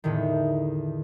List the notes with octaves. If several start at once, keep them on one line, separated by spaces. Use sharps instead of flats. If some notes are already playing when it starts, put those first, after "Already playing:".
E2 A2 D3 D#3